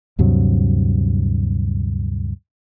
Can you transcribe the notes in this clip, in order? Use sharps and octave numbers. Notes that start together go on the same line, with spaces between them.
D2 G2 C3 F#3